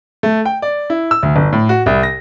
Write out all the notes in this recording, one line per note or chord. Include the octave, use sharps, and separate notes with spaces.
A3
G5
D5
E4
E6
D2
G1
A2
F#4
C2
A#6